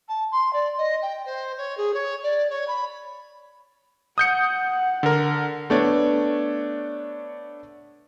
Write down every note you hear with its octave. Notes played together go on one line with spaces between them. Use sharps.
A5
C6
D5
D#5
G5
C5
C#5
G#4
C#5
D5
C#5
B5
F#5 D#6 G6 C#7
D3 A#4
A3 B3 D4 C#5 D5